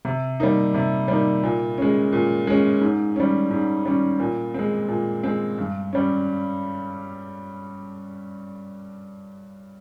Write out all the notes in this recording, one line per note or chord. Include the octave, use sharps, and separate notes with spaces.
C3
G3 A#3 D#4
C3
G3 A#3 D#4
A#2
G#3 C#4
A#2
G#3 C#4
G#2
G3 C#4
G#2
G3 C#4
A#2
G#3 C4
A#2
G#3 C4
G2
G3 C#4